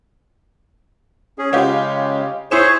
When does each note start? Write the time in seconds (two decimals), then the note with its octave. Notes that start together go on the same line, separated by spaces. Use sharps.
1.39 C#4 G#4
1.53 C#3 G#3 C#4 F4 G4
2.51 E4 G#4 C5 C#5 C#6 E7